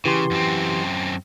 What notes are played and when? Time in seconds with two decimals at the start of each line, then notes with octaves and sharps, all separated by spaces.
0.05 C#3 E3 G4 C6
0.31 F#2 C4